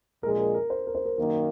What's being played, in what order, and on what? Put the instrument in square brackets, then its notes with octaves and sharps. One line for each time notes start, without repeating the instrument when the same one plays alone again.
[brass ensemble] A#1 A#2 G#3 [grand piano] A#4
[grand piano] A#4
A#4
C5
A#4
C5
A#4
[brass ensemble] F#2 D#3 A#3 [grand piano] A#4